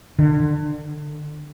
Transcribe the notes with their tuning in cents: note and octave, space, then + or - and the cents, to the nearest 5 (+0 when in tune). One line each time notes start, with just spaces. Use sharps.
D3 +25